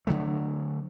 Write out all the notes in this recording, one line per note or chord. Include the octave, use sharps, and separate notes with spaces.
D3 D#3 F#3 A3